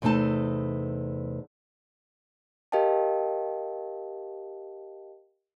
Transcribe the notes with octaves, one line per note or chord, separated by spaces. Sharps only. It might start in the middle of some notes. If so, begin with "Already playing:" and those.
E2 C3 A3 D#4 A5
G4 A#4 D#5 F5 G5 A5